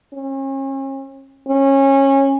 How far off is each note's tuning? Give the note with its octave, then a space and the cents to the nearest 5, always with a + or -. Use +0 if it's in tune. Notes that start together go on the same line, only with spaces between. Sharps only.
C#4 -40
C#4 -20